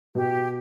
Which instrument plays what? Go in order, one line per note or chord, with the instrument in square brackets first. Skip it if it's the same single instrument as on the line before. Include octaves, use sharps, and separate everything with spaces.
[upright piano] B2 [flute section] G4